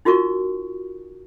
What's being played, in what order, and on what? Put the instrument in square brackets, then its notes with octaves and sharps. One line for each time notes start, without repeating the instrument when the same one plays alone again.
[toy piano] D#4 F4 F#4 A#4 C#6